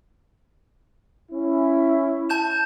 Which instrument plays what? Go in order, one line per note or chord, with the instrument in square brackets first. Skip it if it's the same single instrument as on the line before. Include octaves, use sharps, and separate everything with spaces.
[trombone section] C#4 E4
[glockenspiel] A5 G6 E7